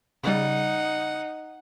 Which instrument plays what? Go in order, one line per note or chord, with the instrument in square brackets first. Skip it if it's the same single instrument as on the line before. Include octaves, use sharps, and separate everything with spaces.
[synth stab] C#3 G3 [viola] D#4 [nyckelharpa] F#5